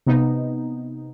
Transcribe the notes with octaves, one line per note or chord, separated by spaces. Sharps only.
C3 B3 D#4